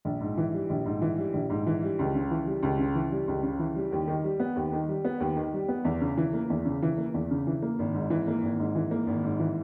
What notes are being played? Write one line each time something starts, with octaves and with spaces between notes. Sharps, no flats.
A#1
G#2
E3
G3
A#1
G#2
E3
G3
A#1
G#2
E3
G3
C#2
C#3
E3
G3
C#2
C#3
E3
G3
C#2
C#3
E3
G3
D#2
D#3
G3
B3
D#2
D#3
G3
B3
D#2
D#3
G3
B3
E2
C#3
E3
A#3
E2
C#3
E3
A#3
E2
C#3
E3
A#3
G#1
G#2
E3
A#3
G#1
G#2
E3
A#3
G#1
G#2
E3